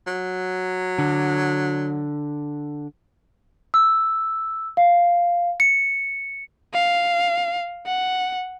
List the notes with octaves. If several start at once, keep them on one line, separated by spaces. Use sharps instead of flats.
F#3
D3
E6
F5
C#7
F5
F#5